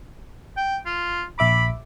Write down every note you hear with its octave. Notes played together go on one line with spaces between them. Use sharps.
G5
F4
A#1 E5 B5 D6